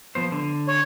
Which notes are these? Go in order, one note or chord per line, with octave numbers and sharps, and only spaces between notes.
F3 B3 C5
D3
C#5